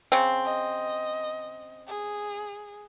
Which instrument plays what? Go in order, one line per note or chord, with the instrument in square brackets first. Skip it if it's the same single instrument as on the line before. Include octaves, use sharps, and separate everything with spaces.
[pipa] C#3 C4
[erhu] D#5
G#4